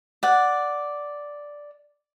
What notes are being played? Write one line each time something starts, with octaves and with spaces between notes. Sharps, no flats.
D5 F#5